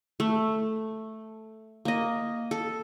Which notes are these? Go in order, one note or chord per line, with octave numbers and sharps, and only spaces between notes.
A3
A#3 D#5
A4